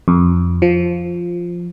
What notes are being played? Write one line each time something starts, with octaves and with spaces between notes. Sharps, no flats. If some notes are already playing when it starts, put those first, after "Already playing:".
F2
F3